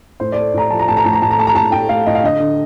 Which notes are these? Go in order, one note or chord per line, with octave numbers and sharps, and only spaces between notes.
A2 C5
A3 D5
A2 A#5
F3 A5
A#5
A2 A5
A#5
A2 A5
A#5
A2 A5
A#5
A3 A5
A#5
A2 A5
A2 G5
A3 F5
A2 D#5
F5
D3 D#5
D3